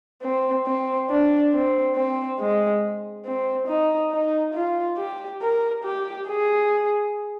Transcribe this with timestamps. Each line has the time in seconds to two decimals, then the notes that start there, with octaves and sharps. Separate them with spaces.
0.22 C4
0.67 C4
1.10 D4
1.52 C4
1.96 C4
2.39 G#3
3.26 C4
3.68 D#4
4.12 D#4
4.54 F4
4.98 G4
5.42 A#4
5.84 G4
6.28 G#4